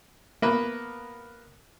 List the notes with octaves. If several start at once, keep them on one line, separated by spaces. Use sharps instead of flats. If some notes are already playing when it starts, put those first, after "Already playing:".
A#3 B3 B4